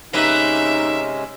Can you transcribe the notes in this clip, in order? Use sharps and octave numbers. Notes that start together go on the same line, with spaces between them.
C3 G#3 A#3 C#4 D#4 B4 E5